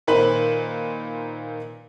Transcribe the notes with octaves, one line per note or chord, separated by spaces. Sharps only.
A#2 D#3 B4 C5 F#7